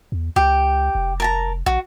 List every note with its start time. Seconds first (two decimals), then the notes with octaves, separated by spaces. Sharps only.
0.12 E2
0.36 C#2 G4
0.95 F1
1.20 A#4 A5 A#5
1.66 A#1 F#4